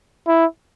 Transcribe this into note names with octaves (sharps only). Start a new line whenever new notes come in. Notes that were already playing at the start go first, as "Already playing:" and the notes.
E4